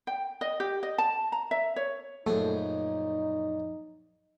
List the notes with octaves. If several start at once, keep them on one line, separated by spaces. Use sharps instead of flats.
G5
D#5
G4
D#5
A5
A#5
E5
C#5
A#1 F#2 A3 D#4 G#4